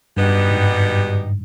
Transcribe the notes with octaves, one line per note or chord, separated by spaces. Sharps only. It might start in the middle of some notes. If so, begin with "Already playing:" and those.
G2 B2 G3 B3 D#4 G4
G#2